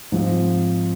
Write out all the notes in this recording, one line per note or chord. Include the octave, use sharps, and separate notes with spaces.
G#2 F3 C4 F4